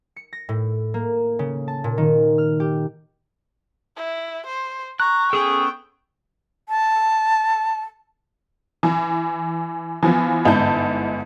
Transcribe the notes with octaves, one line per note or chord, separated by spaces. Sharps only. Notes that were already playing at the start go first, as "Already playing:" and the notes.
C#7
A#6
A2
A#3
C#3
A5
A#2
D#3
F6
G4
E4
C5
A#5 C#6 F#6
B3 C#4 G#4 A4 G5
A5
E3
E3 F3 B3
G1 G#2 E4 A5 G6